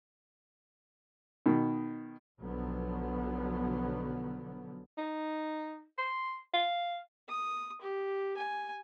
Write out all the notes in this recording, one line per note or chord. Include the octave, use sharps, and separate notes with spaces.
B2 D#3
B1 D3 F3 F#3 B3
D#4
C6
F5
D#6
G4
G#5